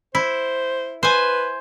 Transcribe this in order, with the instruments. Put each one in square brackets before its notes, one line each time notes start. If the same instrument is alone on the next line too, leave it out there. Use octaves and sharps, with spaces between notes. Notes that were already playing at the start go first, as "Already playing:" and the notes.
[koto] E4 [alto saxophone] C5
[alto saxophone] B4 [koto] C5 G#5